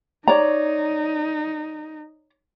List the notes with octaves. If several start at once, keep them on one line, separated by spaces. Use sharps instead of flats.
D#4 C#5 D5 A#5